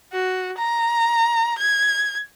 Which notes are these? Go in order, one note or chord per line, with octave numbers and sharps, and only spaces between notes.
F#4
A#5
G#6